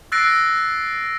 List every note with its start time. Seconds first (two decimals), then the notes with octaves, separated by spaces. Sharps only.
0.12 E6 F#6 A6 A#6 C7 D7